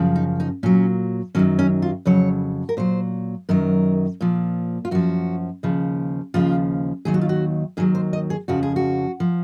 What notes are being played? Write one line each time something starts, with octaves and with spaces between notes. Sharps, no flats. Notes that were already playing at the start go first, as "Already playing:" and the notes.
Already playing: F#2 C#3 F3
D#4
D#4
A#2 F#3 C#4
F#2 D#3 F#3 C#4
C#4
F4
F2 C#3 F#3 C#5
A#4
A#2 F#3 C5
F#2 D#3 F#3 A#4
A#2 F3
F4
F#2 F3 F#4
D#2 C#3 F3
D#2 C#3 F3 F4
D#2 D#3 F#3 G#4
F#4
F4
F#4
D#2 D#3 F#3 G#4
C5
D#5
G#4
F2 C#3 F3 F#4
G#4
F#4
F3